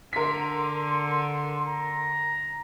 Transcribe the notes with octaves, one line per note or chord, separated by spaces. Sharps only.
D3 A#4 C6 B6
A#5